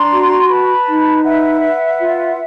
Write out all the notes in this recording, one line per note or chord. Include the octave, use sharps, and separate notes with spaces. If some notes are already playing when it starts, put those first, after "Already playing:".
Already playing: D4 A#5 C6
F#4
C6
B4 A5 B5
D#4
B4 E5 F#5
B4
F4